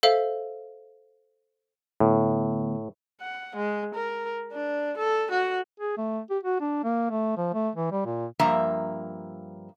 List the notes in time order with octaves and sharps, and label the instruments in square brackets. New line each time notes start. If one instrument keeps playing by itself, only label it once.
[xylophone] A4 C5 E5 F5
[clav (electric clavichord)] A2 [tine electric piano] D3 A3 B3
[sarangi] F#5
G#3
A#4
D4
A4
F#4
[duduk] G#4
A3
G4
F#4
D4
A#3
A3
F3
A3
E3
G3
A#2
[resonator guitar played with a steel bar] G2 F3 A#3 E5 A#5